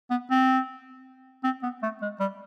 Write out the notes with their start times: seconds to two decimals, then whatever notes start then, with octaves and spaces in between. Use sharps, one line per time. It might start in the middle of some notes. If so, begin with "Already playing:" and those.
0.10 B3
0.30 C4
1.44 C4
1.63 B3
1.83 A3
2.02 G#3
2.20 G3